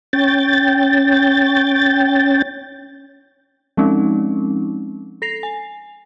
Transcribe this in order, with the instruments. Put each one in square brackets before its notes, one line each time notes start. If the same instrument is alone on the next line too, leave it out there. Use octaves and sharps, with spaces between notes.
[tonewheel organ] C#4 G5 A6
[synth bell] F3 G#3 C4 C#4 D#4
A4 A#6 C7 F7
G#5